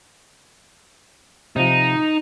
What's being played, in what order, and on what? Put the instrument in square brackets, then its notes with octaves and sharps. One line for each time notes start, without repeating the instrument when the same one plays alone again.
[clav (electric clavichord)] C3 F3 [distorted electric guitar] D#4